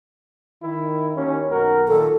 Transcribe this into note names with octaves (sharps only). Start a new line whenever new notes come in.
D#3 E4
D#2 C#4
B1 F#4 A#4
A#2 D#3 A4